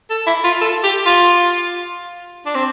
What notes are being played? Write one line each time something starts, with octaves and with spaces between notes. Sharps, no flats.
A4
E4
F4
A4
G4
F4
D4
C4